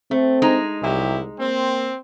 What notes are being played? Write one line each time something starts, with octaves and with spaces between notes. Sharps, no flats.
A3 C4
G#3 D#4
C2 F#3 E4 G4
A#3 C4